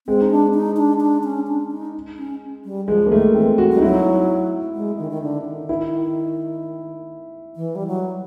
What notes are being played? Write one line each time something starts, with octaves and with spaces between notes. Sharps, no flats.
G#3 C4
D#4
D4
D#4
D4
D4
C#4
D4
D#4
C#4
G3
F3 G#3
A#3
D#3 A3
E3 C4
F#4
G3
D#4
F#3 E4
G#3
D#3
D#3
D3
D#3
E4
E3
G3
F#3